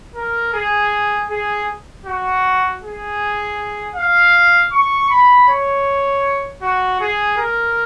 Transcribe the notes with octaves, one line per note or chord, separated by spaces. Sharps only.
A#4
G#4
G#4
F#4
G#4
F5
C#6
B5
C#5
F#4
G#4
A#4